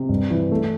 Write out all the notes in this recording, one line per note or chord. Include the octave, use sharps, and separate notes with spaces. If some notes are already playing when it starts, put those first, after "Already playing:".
Already playing: C3
G2
E3
A3